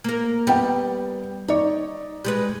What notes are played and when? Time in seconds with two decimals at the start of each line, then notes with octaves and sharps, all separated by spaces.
0.04 A#3 A#4
0.47 G3 B3 G5
1.48 D#4 C#5 D5
2.25 G3 G#3 B4